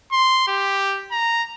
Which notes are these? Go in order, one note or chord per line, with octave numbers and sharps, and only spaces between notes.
C6
G4
A#5